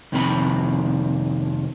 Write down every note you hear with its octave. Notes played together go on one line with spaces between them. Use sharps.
F2 C3 D#3 A#3 G#4 B5